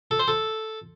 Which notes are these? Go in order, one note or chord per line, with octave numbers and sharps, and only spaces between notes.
A4
C5
A4